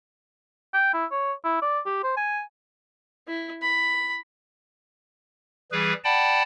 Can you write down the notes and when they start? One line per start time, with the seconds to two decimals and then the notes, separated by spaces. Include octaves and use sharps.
0.74 G5
0.94 E4
1.11 C#5
1.45 E4
1.62 D5
1.86 G4
2.03 C5
2.17 G#5
3.27 E4
3.62 B5
5.72 E3 G3 G#4 B4
6.04 D5 F#5 G5 A5 B5